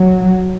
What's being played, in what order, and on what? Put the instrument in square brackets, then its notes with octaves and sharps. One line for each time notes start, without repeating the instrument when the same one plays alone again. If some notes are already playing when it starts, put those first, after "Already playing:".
Already playing: [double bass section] F#3